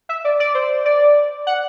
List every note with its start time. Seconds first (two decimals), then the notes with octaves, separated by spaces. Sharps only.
0.09 E5
0.24 D5
0.40 D5
0.54 C5
0.85 D5
1.47 F#5